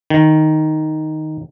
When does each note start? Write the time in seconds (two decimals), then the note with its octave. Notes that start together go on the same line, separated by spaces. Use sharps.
0.10 D#3